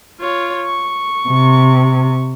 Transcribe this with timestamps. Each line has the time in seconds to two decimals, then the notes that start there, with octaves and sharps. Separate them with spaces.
0.20 F4 C#5
0.66 C#6
1.29 C3